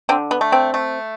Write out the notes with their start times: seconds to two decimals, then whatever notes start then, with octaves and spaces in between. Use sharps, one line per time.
0.09 D3 C4
0.31 B3
0.41 A3
0.52 C4
0.74 A3